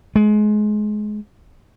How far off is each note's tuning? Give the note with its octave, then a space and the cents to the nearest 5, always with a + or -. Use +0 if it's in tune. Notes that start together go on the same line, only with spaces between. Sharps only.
G#3 +25